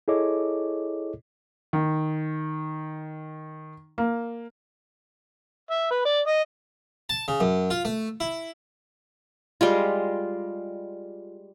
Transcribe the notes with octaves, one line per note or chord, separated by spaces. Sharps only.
E4 G#4 A4 C#5 D#5 D6
D#3
A#3
E5
B4
D5
D#5
A5
C#3
F#2
F4
A3
E4
G3 G#3 F4